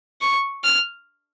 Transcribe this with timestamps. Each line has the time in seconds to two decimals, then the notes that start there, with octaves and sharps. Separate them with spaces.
0.21 C#6
0.64 F6